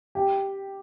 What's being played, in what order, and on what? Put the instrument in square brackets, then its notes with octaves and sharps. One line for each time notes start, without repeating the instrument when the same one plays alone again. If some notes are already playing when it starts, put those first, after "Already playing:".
[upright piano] G4